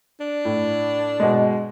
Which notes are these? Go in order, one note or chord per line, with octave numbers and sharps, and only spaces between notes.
D4
A2
B2 G#3